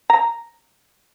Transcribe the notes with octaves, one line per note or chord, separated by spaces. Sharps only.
A#5